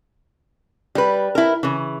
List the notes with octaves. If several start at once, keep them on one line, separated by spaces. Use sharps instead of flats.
G3 B4
E4 A#4
C#3 E3